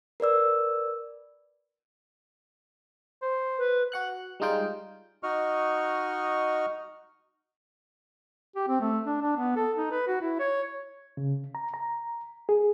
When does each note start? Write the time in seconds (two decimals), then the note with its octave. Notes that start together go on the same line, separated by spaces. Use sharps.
0.20 A#4 B4 D5 E6
3.22 C5
3.58 B4
3.92 F#4 F#5 F#6
4.40 G3 G#3 D#4 F4 G5
5.23 D#4 F#4 D#5 C#6 F6
8.56 G4
8.68 C4
8.81 A3
9.06 D4
9.22 D4
9.37 B3
9.56 A4
9.76 D#4
9.91 B4
10.07 F#4
10.21 E4
10.39 C#5
11.17 C#3
11.55 A#5
11.74 A#5
12.49 G#4